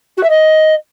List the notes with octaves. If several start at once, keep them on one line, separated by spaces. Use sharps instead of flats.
F#4
E5
D#5